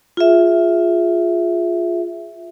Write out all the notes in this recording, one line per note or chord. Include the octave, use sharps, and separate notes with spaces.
F4 G#4 E5